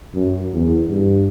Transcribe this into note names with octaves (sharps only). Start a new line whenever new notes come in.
F#2
E2
G2